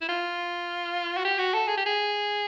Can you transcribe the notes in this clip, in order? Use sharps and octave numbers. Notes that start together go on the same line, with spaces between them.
E4
F4
F#4
G4
F#4
A4
G#4
G4
G#4